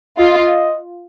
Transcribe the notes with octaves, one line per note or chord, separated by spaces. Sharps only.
F4 D#5